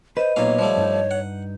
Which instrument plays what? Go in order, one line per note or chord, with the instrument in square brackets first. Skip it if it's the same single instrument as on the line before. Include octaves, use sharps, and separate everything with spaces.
[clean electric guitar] B4 [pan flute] C5 [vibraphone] D#5
[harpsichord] B1 A#2 F5 [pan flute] C#5
[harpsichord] F3 G3 A3
[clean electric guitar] G2 D#4
[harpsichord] F#5